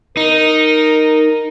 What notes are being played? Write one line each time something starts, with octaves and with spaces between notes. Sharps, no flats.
D#4 A#4